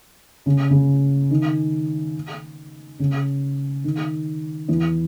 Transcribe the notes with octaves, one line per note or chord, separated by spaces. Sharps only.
C#3
C#3
D#3
C#3
D#3
E2 E3